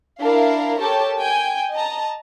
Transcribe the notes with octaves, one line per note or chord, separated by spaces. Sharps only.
D4 E4 A#4 F5
G4 A4 A#4 C#5 A5
G5 G#5
D#5 A5 A#5